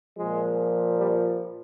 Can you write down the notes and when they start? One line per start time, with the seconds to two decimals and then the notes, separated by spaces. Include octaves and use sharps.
0.17 A#2 F3 G#3
0.98 G3